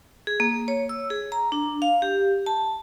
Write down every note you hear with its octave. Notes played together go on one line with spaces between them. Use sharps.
G#4
A#3
C#5
E6
G#4
A#5
D4
F5
G4
A5